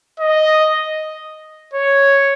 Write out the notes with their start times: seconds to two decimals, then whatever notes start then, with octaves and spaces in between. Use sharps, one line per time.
0.20 D#5
1.73 C#5